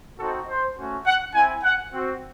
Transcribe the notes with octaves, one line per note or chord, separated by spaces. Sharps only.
C4 D#4 F#4 A4
C5
A3 C#4 F#4
F#5
C4 E4 G#5
F#5
C4 F#4